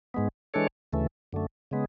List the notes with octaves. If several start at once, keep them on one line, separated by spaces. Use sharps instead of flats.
G#2 G#3 B3
E3 G#3 D4 A4 C#5
D2 C#3 E3 A3
F#2 D3 A3
C#3 G#3 B3